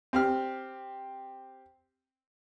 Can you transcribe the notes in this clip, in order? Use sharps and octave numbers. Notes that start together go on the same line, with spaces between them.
C4 G4 F6